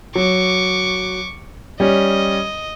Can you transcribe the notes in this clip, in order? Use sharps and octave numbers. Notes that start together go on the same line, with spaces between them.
F#3 C#6 D6
G3 C#4 D#5